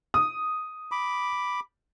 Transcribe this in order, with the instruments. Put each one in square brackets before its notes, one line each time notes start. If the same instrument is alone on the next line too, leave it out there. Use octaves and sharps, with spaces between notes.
[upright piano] D#6
[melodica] B5 D6